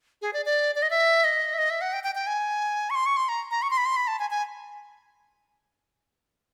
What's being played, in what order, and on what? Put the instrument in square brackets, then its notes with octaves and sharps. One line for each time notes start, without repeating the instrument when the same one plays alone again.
[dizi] G#4
D5
D5
D5
D#5
E5
D#5
E5
D#5
E5
F#5
G5
G5
G5
G#5
C#6
C6
C#6
C6
A#5
A#5
C#6
C6
B5
C6
B5
A5
G#5
G#5